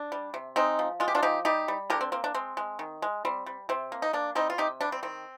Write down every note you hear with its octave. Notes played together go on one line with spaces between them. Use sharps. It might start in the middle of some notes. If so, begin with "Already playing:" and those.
Already playing: D4
G3
C3
G#3 C4 D#4
F3
G#3 F4
G4
D4 F4
F3 D#4 G4
G3 D#4 G4
G3
D3 G4 A#4
C4
A#3 C4
D4
G#3 C4
G#3
D#3
G#3
G3 C4
G3
C3 C4
A#3
D#4
A#3 D4
G3 C4 D#4
F4
C3 D#4 G4
G3 D4
C4
D#3 C4